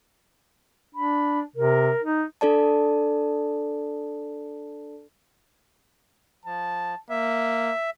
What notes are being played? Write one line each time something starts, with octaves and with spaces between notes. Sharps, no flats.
D4 B5
C3 A#4
D#4
D4 A4 D5 A5
F3 A5
A#3 E5